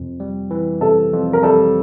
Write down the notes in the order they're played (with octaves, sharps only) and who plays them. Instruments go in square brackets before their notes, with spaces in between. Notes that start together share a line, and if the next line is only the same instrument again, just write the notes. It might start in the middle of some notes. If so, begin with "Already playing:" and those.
Already playing: [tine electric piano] F2 C3
G3
E3
[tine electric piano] C3 [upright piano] A4
[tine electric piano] F2
[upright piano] A#4
[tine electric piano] G3 [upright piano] A4